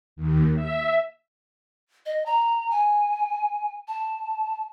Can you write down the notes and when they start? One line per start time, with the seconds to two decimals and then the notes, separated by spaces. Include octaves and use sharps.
0.16 D#2
0.55 E5
2.06 D#5
2.26 A#5
2.71 G#5
3.88 A5